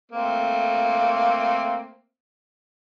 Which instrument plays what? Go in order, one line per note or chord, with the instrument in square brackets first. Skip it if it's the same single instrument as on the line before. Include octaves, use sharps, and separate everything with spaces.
[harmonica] A3 A#3 C4